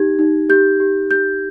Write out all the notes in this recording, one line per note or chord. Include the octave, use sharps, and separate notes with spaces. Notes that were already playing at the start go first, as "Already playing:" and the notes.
Already playing: D#4 G4 G#6
D#4
G4 G6
G4
G4 G6